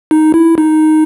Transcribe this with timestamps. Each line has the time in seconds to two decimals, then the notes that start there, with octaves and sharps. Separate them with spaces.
0.11 D#4
0.34 E4
0.58 D#4